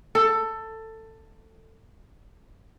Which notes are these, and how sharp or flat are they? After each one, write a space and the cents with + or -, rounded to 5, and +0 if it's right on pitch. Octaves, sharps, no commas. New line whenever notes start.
A4 +15